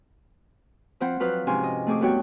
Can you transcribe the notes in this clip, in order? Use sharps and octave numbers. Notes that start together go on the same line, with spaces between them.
F3 C4 C5 F#5 B5
F3 F#3 B4 F5 D#6
G#2 C3 F3 C#4 G#5 C6
D#5
A3 C4 G#4 C#6 D6
G2 B3 F#4 C#5 G5